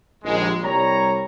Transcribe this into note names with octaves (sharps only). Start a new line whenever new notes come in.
A#1 D#2 G#3
C2 G3 C#5 A#5